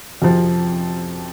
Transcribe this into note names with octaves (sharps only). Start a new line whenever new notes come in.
F2 C3 F3